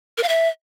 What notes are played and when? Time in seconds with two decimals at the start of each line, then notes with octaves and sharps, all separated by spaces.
0.18 A#4
0.23 F5
0.29 E5